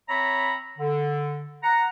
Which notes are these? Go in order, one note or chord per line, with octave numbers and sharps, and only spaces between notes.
C4 C#5 E5 A#5 B5
D3
F#5 A#5